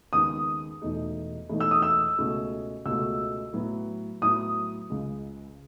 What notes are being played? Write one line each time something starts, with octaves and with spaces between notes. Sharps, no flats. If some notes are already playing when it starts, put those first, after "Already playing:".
D#2 C#3 G#3 B3 D#6
E1 E2 B2 A3 D#4
E1 E2 B2 A3 D#4
E6
D#6
E6
C#2 B2 A3 C#4 F#4
C#2 B2 A3 C#4 F#4 E6
A2 F#3 B3
A2 F#3 B3 D#6
C#2 C#3 G#3